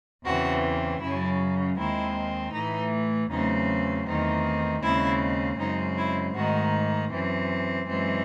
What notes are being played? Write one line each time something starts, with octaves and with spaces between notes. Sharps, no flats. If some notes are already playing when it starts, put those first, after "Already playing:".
E2 C#3 E3 C4 F#4
F#2 C#3 F#3 E4
D#2 D#3 G#3 C4 E4
A2 E3 A3 D#4
E2 C#3 F#3 A3 C4 D#4
E2 D#3 A3 C4 D#4
D#2 C#3 G#3 C4 E4
F#2 C#3 G#3 C4 D#4
E4
G#2 D#3 A3 F#4
F#2 E3 C4
F#2 E3 G#3 C4